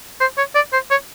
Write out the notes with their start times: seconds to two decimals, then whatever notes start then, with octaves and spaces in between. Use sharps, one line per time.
0.20 C5
0.38 C#5
0.55 D5
0.73 C5
0.91 C#5